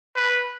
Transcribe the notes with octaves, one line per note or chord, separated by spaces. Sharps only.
B4